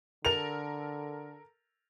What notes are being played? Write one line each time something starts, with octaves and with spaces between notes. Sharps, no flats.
D3 A4 A#4 F7